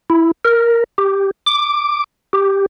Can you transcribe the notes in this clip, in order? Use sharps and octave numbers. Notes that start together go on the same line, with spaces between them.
E4
A#4
G4
D6
G4